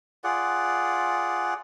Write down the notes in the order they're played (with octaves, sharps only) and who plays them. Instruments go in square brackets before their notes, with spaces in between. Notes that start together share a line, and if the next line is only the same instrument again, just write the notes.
[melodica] F4 G#4 D5 F#5